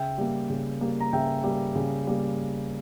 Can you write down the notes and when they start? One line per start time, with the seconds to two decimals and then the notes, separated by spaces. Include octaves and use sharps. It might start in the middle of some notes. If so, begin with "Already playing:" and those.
Already playing: C#3 E5 G5
0.18 G3 A#3
0.50 C#3
0.81 G3 A#3
1.00 A#5
1.13 C#3 E5 G5
1.44 G3 A#3
1.75 C#3
2.07 G3 A#3